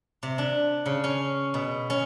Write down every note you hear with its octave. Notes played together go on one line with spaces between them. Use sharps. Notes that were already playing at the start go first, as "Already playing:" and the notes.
C3
D4
C#3
C#4
B2
C#4